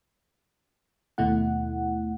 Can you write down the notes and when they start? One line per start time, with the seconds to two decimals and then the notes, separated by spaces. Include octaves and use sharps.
1.18 D#2 B2 A3 E4 F#5